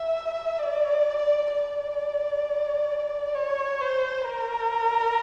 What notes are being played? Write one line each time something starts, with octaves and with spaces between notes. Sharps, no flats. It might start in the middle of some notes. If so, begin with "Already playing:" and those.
Already playing: E5
D5
D5
C#5
C5
A#4